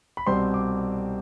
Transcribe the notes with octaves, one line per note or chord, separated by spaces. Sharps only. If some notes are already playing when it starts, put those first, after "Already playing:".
B5
C2 B2 G3 C4 C6
D6